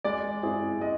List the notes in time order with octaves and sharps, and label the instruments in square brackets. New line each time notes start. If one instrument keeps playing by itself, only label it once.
[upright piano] G#3 [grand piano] D5
[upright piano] C4 E4 G#4
[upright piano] G#3 [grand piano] D#5